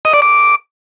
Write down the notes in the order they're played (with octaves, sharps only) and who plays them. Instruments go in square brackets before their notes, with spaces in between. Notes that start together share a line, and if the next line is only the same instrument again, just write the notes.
[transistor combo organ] D#5
D5
D6